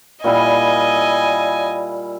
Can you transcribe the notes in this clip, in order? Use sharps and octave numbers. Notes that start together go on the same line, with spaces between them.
A#2 G3 E4 D#5 G#5